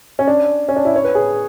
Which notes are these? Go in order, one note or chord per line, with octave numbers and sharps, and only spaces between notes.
C#4
D4
C#4
D4
E4
C#5
B4
G#4